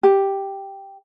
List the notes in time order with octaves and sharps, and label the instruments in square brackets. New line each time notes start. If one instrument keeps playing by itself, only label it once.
[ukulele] G4